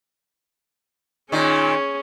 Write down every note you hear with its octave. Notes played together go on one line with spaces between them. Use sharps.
A#2 D#3 C#4 G#4